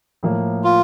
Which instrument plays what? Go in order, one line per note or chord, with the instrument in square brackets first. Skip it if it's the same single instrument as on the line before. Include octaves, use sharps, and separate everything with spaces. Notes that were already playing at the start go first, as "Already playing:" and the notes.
[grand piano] A2 F3 A#3
[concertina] F4